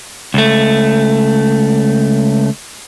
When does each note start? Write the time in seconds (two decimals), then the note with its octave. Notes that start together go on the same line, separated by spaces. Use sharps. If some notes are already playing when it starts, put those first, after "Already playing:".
0.34 C#2 A3